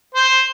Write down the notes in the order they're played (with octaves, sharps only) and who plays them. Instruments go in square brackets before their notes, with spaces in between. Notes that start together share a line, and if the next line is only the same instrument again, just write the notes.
[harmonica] C5